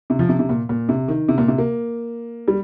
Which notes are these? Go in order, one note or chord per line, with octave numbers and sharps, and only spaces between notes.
C3
F3
C3
C3
A#2
A#2
C3
D#3
C3
A#2
C3
A#3
G3